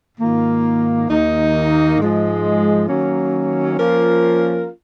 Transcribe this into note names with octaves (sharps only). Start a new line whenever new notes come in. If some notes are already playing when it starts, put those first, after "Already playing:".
G#2 D#3 A#3 F4
D#2 D#3 A#3 D#4
G#2 F3 G#3
D#3 F#3 A#3 C#4
F3 A#3 C#4 F4 A#4